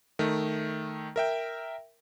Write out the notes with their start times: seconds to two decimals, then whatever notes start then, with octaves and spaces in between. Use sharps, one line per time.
0.19 D#3 A3
1.16 A#4 E5 G5